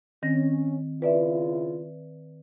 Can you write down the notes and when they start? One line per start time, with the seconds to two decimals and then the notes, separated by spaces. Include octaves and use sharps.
0.23 D#3 C4 C#4 A#6
1.02 C#3 E4 F4 B4 D5 E5